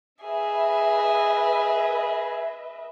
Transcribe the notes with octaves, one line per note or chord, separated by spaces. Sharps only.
G#4 B4 D#5 E5